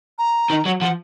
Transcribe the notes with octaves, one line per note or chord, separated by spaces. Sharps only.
A#5
D#3
F#3
F3 F#5